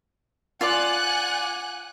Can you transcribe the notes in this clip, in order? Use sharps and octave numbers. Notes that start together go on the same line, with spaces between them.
F4 D5 F#5 G#5 D6 F#6